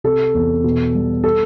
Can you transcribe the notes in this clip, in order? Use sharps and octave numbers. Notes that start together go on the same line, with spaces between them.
C3 A4
E2
B2
G3
A4